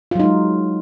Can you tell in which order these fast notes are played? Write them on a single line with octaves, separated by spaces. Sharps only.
F4 F#3 D#4 G#3